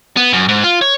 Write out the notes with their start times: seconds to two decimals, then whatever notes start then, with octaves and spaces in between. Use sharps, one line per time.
0.17 B3
0.33 F#2
0.49 G#2
0.64 F4
0.81 C#5